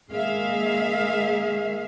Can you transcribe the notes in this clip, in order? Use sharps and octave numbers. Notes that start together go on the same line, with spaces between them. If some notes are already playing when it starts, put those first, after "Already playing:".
D#3 G#3 A#3 G#4 E5 F5